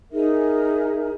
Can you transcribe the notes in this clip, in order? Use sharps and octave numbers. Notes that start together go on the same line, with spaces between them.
D#4 G#4 A#4 E5